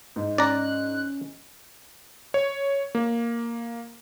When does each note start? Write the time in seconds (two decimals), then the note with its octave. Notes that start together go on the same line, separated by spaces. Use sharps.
0.16 G#2
0.38 C#4 D5 A#5 F#6
2.34 C#5
2.95 A#3